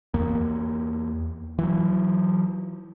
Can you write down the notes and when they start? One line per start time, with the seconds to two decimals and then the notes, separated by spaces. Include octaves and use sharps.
0.14 E2 A#3
1.59 E3 F#3